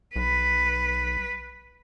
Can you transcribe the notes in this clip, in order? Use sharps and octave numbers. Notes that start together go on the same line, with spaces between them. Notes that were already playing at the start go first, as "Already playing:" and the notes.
B1 B4